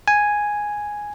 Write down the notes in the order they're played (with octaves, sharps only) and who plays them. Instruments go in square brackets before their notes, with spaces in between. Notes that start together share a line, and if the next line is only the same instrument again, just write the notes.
[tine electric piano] G#5